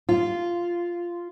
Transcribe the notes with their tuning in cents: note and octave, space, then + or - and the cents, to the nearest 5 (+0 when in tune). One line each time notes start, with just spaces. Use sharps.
F4 -10